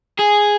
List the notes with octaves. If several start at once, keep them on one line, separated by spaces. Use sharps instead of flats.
G#4